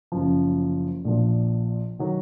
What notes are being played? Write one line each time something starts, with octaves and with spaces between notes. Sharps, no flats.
F#1 F#2 F3
A#1 A#2 F3
D#3 F#3